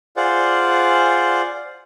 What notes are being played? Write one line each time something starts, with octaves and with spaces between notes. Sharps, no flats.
F4 G#4 C5 D5 F#5